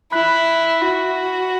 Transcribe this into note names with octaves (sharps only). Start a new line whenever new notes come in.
E4 B5 F#6 B6 F#7
F#4